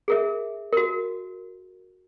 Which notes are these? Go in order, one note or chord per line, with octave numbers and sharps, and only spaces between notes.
G#4 A#4 E5
F#4 A#4